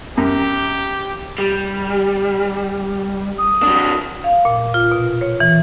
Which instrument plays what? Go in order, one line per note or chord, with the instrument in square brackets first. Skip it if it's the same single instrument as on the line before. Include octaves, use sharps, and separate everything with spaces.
[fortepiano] F#2 [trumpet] G4
[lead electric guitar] G3
[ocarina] D#6
[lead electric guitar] F#3 D4
[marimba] F5
A#2
F4
B2
C#5
E3